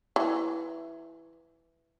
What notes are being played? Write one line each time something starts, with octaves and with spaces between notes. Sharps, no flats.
E3